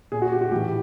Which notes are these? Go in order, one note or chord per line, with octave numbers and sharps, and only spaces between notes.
A#2 G#4
F#4
G4
F#4
A2 E3 G4